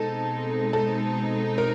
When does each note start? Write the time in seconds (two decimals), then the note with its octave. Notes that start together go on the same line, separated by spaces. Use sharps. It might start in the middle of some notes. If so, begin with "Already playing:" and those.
Already playing: B2 G#3 C4 D#4 A4
0.73 A4
1.58 A#4